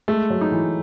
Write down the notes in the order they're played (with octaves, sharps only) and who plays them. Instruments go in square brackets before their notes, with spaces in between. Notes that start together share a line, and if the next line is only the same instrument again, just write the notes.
[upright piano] G#3 [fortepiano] A3
[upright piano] F#3
[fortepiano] D#4
[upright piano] E3